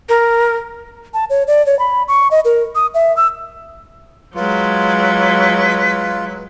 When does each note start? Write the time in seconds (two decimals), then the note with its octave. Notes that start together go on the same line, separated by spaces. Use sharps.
0.09 A#4
1.14 A5
1.30 C#5
1.47 D5
1.66 C#5
1.79 B5
2.08 C#6
2.31 D#5
2.45 A#4
2.75 D#6
2.94 E5
3.17 E6
4.35 F#3 G#3 F4 B4